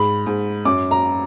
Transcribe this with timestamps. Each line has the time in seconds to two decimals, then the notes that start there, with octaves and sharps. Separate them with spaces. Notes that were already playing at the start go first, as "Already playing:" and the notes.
Already playing: G#2 B5
0.26 G#2
0.65 F#2 D6
0.91 A#5